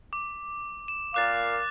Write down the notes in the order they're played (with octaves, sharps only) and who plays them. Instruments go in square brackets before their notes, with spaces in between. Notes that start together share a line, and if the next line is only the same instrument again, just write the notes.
[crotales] D6
E7
[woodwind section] A#2 A#4 F5 [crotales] D6 F#6 A6